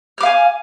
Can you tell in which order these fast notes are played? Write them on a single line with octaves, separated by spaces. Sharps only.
F6 D6 F5 G#5